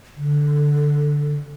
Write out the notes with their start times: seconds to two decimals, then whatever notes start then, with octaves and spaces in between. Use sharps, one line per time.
0.16 D3